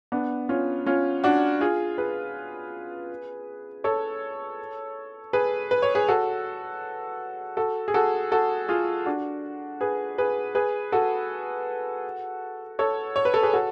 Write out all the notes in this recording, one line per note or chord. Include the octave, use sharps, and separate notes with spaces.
B3 D4
C#4 F4
C#4 F4
D4 F#4
F4 G#4
G#4 B4
A4 C#5
G#4 B4
B4
C#5
G#4 B4
F#4 A4
F#4 A4
G#4
F#4 A4
F#4 A4
F4 G#4
D4 F#4
G#4 B4
G#4 B4
G#4 B4
F#4 A4
A4 C#5
C#5
B4
A4
G#4 B4
F#4 A4